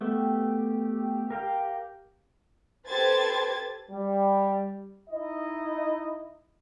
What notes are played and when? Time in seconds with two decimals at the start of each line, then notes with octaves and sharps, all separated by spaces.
0.01 A3 B3 G4
1.30 A#4 F5 G5
2.87 G4 A4 B4 C5 G#6 A6
3.90 G3
5.09 D#4 E4 D#5